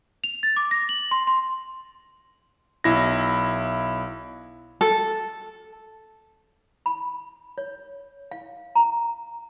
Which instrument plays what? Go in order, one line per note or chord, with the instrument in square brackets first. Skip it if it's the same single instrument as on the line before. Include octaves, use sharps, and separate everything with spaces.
[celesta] F7
A6
D6
A#6
F#7
C6
C6
[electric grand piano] B1 E4 A#6
[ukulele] A4
[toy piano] B5
C#5
F5
A#5